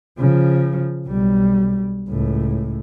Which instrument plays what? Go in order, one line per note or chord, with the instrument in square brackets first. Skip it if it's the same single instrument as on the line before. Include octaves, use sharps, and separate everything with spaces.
[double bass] C#3 F3
B1 G3
C#2 A2